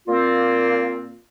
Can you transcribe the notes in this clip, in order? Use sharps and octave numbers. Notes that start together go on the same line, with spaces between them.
A#2 A#3 C4 F4